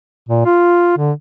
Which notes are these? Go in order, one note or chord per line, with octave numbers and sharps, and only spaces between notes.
A#2
F4
D3